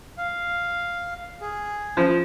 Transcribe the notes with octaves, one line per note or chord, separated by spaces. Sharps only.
F5
G#4
F3